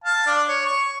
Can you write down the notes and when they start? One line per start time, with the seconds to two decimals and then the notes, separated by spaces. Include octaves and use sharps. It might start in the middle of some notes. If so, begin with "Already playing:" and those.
0.04 F5 A5
0.26 D4
0.48 C#5
0.65 C#6